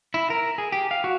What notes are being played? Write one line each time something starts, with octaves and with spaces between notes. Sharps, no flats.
E4
A#4
G#4
G4
F5
F#4